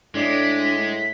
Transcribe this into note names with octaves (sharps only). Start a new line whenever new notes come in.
A2 G#3 D4 D5 B6